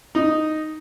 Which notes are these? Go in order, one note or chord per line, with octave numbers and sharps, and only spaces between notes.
D#4